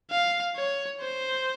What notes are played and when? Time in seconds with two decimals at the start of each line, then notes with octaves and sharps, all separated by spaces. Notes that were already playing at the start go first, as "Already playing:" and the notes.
0.10 F5
0.56 C#5
1.01 C5